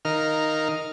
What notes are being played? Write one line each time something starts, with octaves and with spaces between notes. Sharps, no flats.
D#3 D#4 A#4 F5 F6